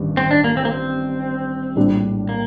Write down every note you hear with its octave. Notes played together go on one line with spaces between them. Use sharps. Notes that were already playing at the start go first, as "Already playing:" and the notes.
Already playing: A1 G2 D#3
C4
D4
A#3
C4
A#3
C4
A#1 A2 G3 D4
A#3